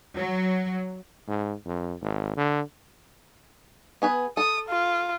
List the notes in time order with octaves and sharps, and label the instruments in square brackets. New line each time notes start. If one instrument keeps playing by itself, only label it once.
[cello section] F#3
[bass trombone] G#2
F2
G#1
D3
[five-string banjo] B3 G#4 B4
[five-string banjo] A4 [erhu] D#6
[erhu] F4